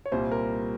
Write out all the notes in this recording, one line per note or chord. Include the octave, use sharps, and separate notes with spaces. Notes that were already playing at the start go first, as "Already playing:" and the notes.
C#5
C2 A#2 G3 C5
A#4